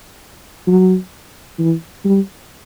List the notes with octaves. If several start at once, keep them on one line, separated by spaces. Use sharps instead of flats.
F#3
E3
G3